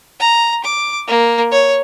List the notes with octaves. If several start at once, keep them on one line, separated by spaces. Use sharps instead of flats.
A#5
D6
A#3
C#5